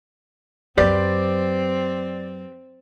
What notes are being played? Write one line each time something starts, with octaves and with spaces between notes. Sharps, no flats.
F#2 F#3 C4 G4 B4 C5 D5